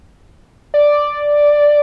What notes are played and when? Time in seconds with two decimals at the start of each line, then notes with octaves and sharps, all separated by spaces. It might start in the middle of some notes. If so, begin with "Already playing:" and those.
0.74 D5